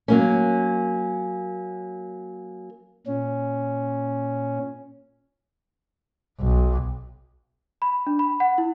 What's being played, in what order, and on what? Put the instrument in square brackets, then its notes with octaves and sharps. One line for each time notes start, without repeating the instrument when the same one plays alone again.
[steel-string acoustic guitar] F#3 A#3 C#4
[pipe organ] A#2 C#4
[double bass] B1
[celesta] B5
D4
B5
F#5
E4